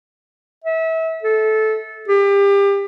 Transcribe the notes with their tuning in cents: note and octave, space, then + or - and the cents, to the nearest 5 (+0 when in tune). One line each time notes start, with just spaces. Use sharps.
E5 -30
A4 -15
G4 +30